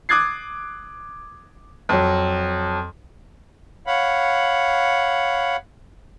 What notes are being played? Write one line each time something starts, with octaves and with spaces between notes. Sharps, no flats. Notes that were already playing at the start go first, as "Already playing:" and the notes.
D6 D#6 F#6 G#6 A6 C7
F2 F#3
C#5 F5 F#5 B5